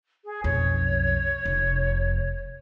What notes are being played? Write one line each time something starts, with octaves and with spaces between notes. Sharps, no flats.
G#4
B1 F2 C#5
F1